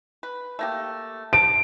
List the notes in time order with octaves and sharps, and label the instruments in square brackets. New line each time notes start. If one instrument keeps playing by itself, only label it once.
[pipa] B4
A3 A#3 G4
[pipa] A5 [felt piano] D7